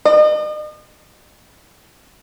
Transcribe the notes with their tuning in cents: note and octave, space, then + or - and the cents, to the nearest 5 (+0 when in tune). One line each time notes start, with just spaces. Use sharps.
D#5 -40